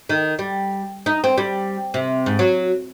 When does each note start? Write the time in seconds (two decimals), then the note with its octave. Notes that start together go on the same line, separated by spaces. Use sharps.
0.09 D#3
0.39 G3
1.06 D#4
1.24 C4
1.38 G3
1.94 C3
2.26 G#2
2.39 F#3